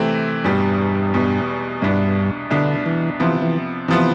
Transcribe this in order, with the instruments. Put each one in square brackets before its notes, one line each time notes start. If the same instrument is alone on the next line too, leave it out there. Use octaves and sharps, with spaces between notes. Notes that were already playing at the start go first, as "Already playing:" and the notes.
Already playing: [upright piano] C3 E3 A3 C4
[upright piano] E2 B2 G3 [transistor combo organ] G2
[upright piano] E2 B2 G3
[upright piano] C2 B2 B3 D4 [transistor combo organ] G2
[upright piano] C2 B2 B3 D4 [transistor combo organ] D3
[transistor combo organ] E3
[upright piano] C3 F3 B3 [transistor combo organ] E3
[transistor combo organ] E3
[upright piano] C3 F3 B3 [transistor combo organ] E3